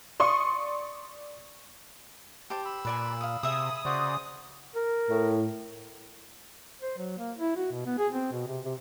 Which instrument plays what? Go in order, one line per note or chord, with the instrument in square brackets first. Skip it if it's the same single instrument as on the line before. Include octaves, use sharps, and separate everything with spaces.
[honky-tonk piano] D5 C6 C#6 D#6
[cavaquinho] G4 C5 [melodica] A5
[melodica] B5 E6
[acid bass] A#2 [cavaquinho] B4 D5 G#5
[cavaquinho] F5 D#6
[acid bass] C3 [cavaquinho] G#4 E5 [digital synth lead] D#6
[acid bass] C#3 [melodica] F#4 C5 D5
[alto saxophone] A#4
[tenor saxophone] A2
[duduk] C5
F#3
A#3
E4
F#4
B2
B3
G#4
C4
B2
C3
C3